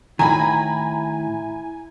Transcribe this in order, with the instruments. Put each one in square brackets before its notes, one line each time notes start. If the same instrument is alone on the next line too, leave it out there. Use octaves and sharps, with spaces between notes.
[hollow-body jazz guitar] A2 D#3 [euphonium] E4 [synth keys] G#5 [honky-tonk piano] A#5 B5